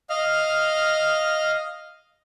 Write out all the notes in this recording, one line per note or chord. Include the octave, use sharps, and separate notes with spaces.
D#5 F5 F6